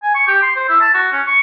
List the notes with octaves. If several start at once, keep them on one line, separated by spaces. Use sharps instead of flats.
G#5
C#6
G4
C6
C5
E4
A5
F#4
C#4
C#6